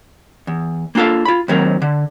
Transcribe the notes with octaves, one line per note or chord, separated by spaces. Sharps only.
E2
A#3 D4 F4 A4 F5
F4 B5
D#2 F#3 C4 A#4
D3